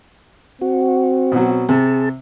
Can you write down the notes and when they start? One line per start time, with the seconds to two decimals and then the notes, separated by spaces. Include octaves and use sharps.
0.62 C4 F#4
1.32 B2 F#3
1.69 C3 G#4 A5